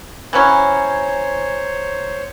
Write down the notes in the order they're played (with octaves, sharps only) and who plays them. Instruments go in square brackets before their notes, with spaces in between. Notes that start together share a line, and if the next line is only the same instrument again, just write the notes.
[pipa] E3 F#3 C#4 [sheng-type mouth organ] C5 C#5 [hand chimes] A#5 G#6